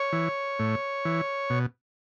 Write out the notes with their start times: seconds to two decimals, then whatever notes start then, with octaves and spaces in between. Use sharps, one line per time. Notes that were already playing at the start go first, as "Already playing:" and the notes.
Already playing: C#5
0.12 E3
0.59 A2
1.05 E3
1.50 B2